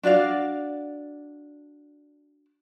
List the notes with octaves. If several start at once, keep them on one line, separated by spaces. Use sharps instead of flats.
D4 F#4 D5 F5